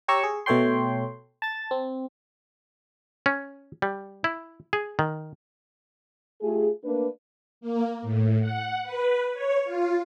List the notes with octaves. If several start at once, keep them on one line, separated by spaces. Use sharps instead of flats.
G4 C#5 A#5 C#6 E6
G#4
B2 A3 A4 C#5 G5 C6
A5 A6
C4
C#4
G3
E4
G#4
D#3
A3 F4 G4 G#4
A3 A#3 D4 B4
A#3
A2
F#5
B4
C#5
F4